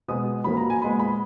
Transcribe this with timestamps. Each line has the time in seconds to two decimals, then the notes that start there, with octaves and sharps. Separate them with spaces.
0.08 B2 G#3 B3 D#6
0.44 A#2 B5
0.47 F#3 A#3
0.57 A#5
0.70 G#5
0.81 A#2 G#3 B3 B5
0.99 B5